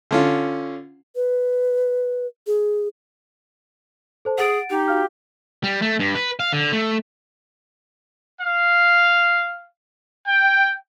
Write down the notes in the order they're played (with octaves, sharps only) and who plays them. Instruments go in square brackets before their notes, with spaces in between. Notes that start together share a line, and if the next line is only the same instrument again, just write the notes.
[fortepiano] D3 C#4 F4
[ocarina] B4
G#4
[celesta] A4 C5 A5
[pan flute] G#4 [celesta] F#5 A6 D7
[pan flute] D#4 [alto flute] G4
[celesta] F#4 F5 F6
[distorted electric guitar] G3
A3
G2
B4
F5
D3
A3
[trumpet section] F5
G5